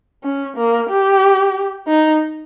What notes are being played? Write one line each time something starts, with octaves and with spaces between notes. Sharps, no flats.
C#4
A#3
G4
D#4